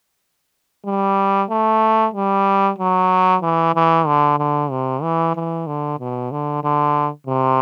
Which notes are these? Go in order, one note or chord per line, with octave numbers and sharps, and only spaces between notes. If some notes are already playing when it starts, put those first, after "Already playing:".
G3
A3
G3
F#3
E3
E3
D3
D3
C3
E3
E3
D3
B2
D3
D3
C3